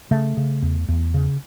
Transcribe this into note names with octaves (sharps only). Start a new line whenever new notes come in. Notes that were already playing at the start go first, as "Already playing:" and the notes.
C#3 A3
C#3
E2
E2
C#3